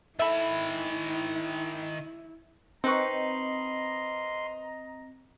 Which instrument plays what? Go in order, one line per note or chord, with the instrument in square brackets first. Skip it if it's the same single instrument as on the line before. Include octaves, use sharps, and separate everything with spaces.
[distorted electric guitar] D#3 B5 [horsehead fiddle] E4 [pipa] A4 E5
[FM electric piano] C4 [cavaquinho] D#4 B4 C#6 [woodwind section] D#5 A#5 [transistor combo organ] C6